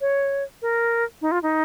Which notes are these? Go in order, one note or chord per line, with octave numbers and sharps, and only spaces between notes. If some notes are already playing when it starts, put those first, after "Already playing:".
C#5
A#4
D#4
F4
D#4